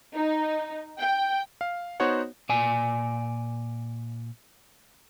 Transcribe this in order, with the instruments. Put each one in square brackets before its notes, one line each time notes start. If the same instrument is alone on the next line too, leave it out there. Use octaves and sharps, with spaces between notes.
[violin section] D#4
G5
[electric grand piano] F5
B3 D#4 F#4 C5 C#5 F#5
[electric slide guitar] A#2 D5 G#5